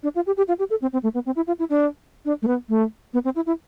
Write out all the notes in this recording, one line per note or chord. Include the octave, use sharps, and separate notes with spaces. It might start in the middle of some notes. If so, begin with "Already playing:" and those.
D4
F4
G4
G4
F4
G4
A4
C4
C4
A3
B3
C4
E4
F4
E4
D4
D4
A3
B3
A3
B3
C4
E4
E4